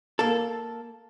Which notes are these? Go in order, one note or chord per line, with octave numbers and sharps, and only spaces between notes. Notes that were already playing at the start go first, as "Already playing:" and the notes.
A#3 A4